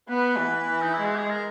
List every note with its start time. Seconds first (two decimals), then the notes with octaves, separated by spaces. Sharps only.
0.08 B3 B4
0.38 E3
0.69 E3
0.82 D#4
0.93 E4
1.00 G#3
1.05 F#4
1.17 G#4
1.30 A#4